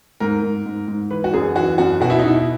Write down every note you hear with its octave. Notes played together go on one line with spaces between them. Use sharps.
G#2 A#4
G#2
G#2
G#2
E3 B4
F#4
F#2 G#4
E3 F#4
F#2 F#4
B2 F#4
E4
D#4
B2 E4